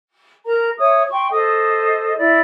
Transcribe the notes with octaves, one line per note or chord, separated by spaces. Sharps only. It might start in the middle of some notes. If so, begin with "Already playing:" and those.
A#4 A#5
C#5 E5 D#6
G5 C6 C#6
A4 C5 D#5 D#6
E4 D5